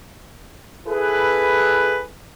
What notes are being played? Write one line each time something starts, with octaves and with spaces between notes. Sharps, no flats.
E4 G#4 A4 B4